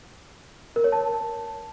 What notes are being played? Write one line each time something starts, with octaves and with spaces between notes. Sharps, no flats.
A#4
C#5
A5